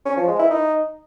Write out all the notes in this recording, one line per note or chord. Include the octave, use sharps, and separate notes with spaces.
C#4
F3
G#3
E4
D#4